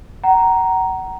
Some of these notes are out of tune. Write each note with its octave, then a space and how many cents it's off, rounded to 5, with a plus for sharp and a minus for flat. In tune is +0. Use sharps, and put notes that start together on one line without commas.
F#5 +35 A#5 +0